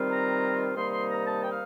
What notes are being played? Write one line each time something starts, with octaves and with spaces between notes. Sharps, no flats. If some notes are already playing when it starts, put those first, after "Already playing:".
Already playing: C3 D#3 G3 C4 F4
A#5
C3 D#3 G3 A#3 D#4 C6
C6
A#5
A5
G5
F5